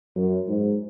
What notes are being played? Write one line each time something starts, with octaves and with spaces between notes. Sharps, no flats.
F#2
G#2